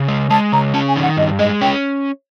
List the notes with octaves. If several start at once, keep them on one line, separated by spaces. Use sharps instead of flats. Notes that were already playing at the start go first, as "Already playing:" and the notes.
Already playing: C#3
G#3
G#3 A5
C#3 A#5
C#4 A5
G#5
D#3
F#5
G2 D#5
G#3 D#5
C#4 G5